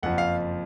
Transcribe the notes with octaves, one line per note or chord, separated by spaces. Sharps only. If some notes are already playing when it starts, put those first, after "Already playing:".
F#1 F2 F3 F#5
F5